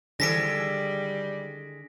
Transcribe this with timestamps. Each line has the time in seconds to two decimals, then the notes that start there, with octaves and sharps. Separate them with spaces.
0.20 D3 D#3 G3 G#3 A4 A#6 B6 D7